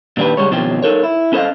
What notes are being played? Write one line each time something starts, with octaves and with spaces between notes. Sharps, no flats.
A#2 D#3 D4 G4 B4
C#3 G3 G#3 C#5
B2 D#3 F3 C4 C#4 G4
D#4 F4 A4 A#4 C#5
E4
C#4 A4 C5 C#5 D#5 F5